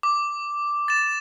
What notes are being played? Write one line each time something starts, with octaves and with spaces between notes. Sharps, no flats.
D6
A6 E7